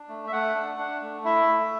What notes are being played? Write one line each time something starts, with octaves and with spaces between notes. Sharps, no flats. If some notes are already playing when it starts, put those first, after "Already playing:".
Already playing: D4
A3
E5
A3 F#5
D4
D4
A3
E4 E5
A3